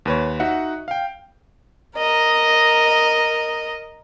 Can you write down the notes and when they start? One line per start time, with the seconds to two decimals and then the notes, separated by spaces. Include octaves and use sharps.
0.06 D#2 B4 C#5
0.40 D#4 F#4 E5 F#5
0.88 F5 G5
1.96 A#4 D#5